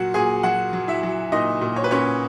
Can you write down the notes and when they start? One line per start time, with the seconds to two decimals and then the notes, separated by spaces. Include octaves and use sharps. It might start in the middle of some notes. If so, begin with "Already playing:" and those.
Already playing: A#2 F#3 F#4 F#5
0.14 A#2 G#4 G#5
0.43 F#3 F#4 F#5
0.73 F#3
0.88 E4 E5
1.03 F#3
1.32 A#2 D#4 D#5
1.61 A#2
1.76 C#5
1.84 B4
1.91 A#2 C#4 C#5